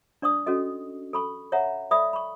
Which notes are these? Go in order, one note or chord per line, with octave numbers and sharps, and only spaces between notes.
D4 D5 C#6 D#6
C#4 F#4 A4 D#5
A4 B5 C#6
C#5 E5 F#5 A#5
A4 D5 E5 B5 D#6
B5 C#6